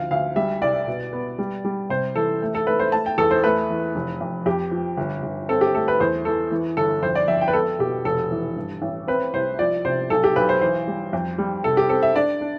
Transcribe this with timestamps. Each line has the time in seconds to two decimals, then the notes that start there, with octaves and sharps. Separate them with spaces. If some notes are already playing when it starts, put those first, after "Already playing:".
Already playing: D2 F3 F5
0.11 D2 F5
0.36 G3 E5
0.62 C2 D5
0.87 B2
1.13 B3
1.39 G3
1.65 G3
1.89 C3 C5
2.16 E3 A4
2.42 A3
2.55 A4
2.67 A3 B4
2.80 C5
2.92 A3 A5
3.06 G5
3.18 E2 A4
3.31 C5
3.44 A3 B4
3.70 E3
3.95 F1
4.21 F2
4.46 F2 G4
4.71 F3
4.97 G1
5.23 G1
5.49 C4 A4
5.61 G4
5.74 A3 A4
5.88 B4
6.00 E2 C5
6.25 E3 A4
6.51 E3
6.77 G1 A4
7.02 F2 C5
7.15 D5
7.28 F2 E5
7.41 G5
7.48 B4
7.53 B3 A4
7.79 B2 G4
8.05 F1 A4
8.31 E3
8.56 G2
8.82 A1
9.08 C4 B4
9.33 C2 C5
9.59 F3 D5
9.85 C3 C5
10.10 B1 A4
10.24 G4
10.36 B1 B4
10.49 C5
10.61 E3 C5
10.87 G3
11.13 F2
11.38 G3
11.64 C3 A4
11.77 G4
11.89 C4 A4
12.03 E5
12.15 D4 D5
12.41 D4